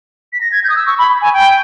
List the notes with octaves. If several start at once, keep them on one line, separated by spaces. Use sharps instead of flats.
B6
A#6
G#6
G6
D#6
E6
C#6
B5
G#5
G5